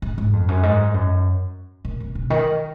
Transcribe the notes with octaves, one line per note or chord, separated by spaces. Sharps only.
G#2
G#2
F2
F#2
G#2
F#2
A#2
B2
B2
D#3